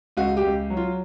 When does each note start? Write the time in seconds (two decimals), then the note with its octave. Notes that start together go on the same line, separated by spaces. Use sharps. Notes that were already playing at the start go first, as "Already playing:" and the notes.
0.17 C#2 F#4
0.37 G4
0.43 C#2
0.70 F#3
0.77 F4